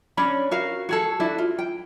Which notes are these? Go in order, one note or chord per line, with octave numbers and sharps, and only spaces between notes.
C#4 D4 C#5 B5
F#4 A#4 F5
F#4 G#4 A4
D4 E4 F#4
F4
G5